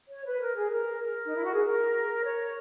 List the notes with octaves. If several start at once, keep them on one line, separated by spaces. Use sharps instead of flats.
C#5
B4
A#4
G#4
A#4
A#4
D#4
E4
F#4
G#4
A#4
C#5